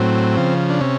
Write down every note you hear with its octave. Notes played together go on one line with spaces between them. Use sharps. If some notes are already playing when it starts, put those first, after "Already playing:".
Already playing: A2 F#3 C4
C#3 F3
D4
C3 C#4